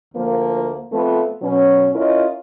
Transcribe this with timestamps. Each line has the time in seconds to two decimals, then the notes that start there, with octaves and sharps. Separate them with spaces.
0.15 D2 F3 A#3
0.93 F2 A3 B3 F4 A4
1.42 B2 F#3 C#4
1.95 C#4 E4 F4 A#4 D#5